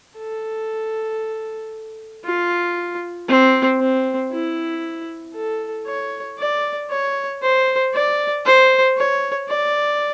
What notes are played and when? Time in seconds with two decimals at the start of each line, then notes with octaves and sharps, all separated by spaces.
0.17 A4
2.24 F4
3.28 C4
3.80 C4
4.31 E4
5.35 A4
5.87 C#5
6.39 D5
6.90 C#5
7.42 C5
7.94 D5
8.45 C5
8.97 C#5
9.49 D5